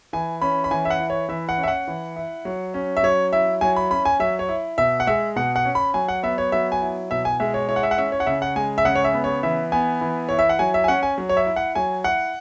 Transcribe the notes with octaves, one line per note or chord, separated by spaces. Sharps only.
E3 G#5
C#4 B5
B5
E3 G#5
E5
F#5
E4
C#5
E3 E5
F#5
C#4
E5
F#5
E3
E4
F#3
C#4
E5
F#3 C#5
E4 E5
F#3 G#5
B5
C#4 B5
G#5
F#3 E5
C#5
E4
B2 E5
F#5
G#3 E5
B2 F#5
F#5
C#4
B5
F#3 G#5
F#5
B3 E5
C#5
F#3 E5
G#5
E4
B2 E5
G#5
G#3 E5
C#5
E4 C#5
F#5
E5
F#5
C#4 E5
C#5
F#5
C#3 E5
F#5
G#3 G#5
E5
C#3 F#5
C#5
E5
B3
C#5
E3 E5
B3 G#5
E3
E4 C#5
E5
F#5
F#3 G#5
E5
G#5
C#4 F#5
G#5
F#3
C#5
E5
E4
F#5
F#3 G#5
E4 F#5